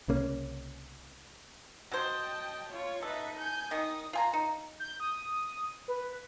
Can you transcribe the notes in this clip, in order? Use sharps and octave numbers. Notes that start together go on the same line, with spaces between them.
C2 C#3 A#3 C#4
F#3 C5 D#5 G5 A5
F4 C#5
D#4 A4 B4 E5
G#5 G6
D#3 D#4 D#6
F4 G#5 A#5
D#4
G6
D#6
B4